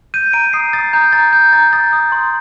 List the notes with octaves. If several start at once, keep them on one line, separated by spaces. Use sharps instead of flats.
G6 D#7
A#5 D7
D#6 C7
D#6 A6
A#5 G6
A#5 A6
G6
A#5 A6
D#6 A6
D#6
C6